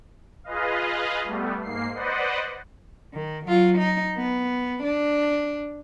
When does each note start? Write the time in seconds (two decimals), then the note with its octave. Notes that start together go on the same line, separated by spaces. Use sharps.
0.44 F4 G#4 B4 D#5 F5
1.24 G3 A3 B3
1.62 G#2 A#3 C7
1.94 B4 C5 D5 D#5 F#5
3.14 D#3
3.45 F#3 F4
3.78 D#4
4.17 B3
4.83 D4